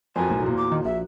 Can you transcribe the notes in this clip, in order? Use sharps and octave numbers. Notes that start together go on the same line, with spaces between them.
F2 F#4 A#4 C5 G#5
B1 A2
E2 A#2
D6
D#3
A#1 E5